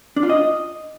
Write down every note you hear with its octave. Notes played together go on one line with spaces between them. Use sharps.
D4
F4
D#5